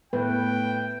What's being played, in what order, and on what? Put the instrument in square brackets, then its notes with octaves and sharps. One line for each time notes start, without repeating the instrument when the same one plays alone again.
[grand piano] A2 [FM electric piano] A3 B3 [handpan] B4 [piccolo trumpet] G5